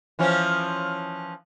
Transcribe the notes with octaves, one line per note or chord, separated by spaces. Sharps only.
E3 F3 C#4